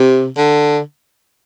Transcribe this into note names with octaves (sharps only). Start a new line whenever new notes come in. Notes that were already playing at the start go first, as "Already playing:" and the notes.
Already playing: C3
D3